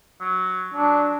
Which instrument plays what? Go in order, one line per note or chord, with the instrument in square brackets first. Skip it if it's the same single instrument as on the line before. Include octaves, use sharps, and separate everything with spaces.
[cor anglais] F#3
[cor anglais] F#3 [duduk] D4